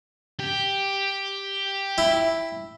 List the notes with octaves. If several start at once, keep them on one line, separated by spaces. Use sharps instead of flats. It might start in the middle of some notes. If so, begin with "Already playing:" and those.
G4
E4